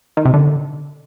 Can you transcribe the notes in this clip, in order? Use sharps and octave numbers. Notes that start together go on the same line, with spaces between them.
D#3
C3
D3